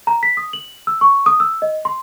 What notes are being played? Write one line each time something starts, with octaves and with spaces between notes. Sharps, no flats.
A#5
B6
D#6
F#7
E6
C#6
D#6
E6
D#5
C6